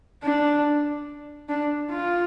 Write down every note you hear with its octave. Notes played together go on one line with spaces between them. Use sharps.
D4
D4
F4